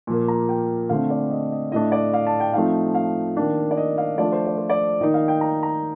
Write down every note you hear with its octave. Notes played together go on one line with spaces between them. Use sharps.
A#2 F3 A#3
A#5
G5
D3 A3 C4 F5
D5
D#5
D#5
A2 A3 D4 D#5
D5
F5
A5
G5
F3 A3 C4 D#4 F5
F5
D#3 A#3 D4
D5
D#5
F5
F3 A3 D4 F4 D5
C5
D5
C5
D5
D#3 A#3 D#4 D#5
F5
G5
A#5
A#5